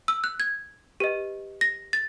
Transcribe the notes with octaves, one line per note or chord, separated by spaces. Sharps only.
E6
F#6
G#6
G4 B4 D#5
A#6
A6